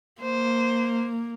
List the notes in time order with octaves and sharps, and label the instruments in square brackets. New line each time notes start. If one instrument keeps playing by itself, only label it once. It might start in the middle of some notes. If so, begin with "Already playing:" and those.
[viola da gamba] A#3 [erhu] C5